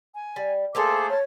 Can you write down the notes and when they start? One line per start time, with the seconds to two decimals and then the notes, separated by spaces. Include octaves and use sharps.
0.16 G#5
0.36 G3
0.75 A3 A#3 G#4 A4 C5 D6
1.10 C#5 A5